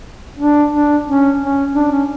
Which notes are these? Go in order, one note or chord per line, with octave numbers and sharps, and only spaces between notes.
D4
D4
C#4
C#4
D4
C#4